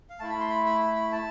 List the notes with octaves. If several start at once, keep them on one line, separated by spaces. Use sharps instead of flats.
F5
A3 E4 A5
B5
C6
B5
B5
B5
B5
A5